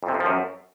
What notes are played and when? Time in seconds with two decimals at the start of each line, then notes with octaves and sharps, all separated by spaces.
0.03 F2
0.08 C3
0.14 F2
0.20 F3
0.26 F#2